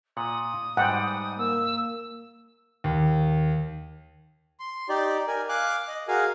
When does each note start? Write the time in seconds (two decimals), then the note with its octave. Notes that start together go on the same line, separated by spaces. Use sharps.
0.17 A#2 F#5 D#6
0.77 G#2 G3 F#5 G5
1.38 A#3 E6
2.84 D#2
4.60 C6
4.89 D#4 G4 D5
5.28 A#4 G#5
5.49 F5 G#5 D6 F#6
5.88 D#5
6.08 F#4 G#4 A#4 F5 G#5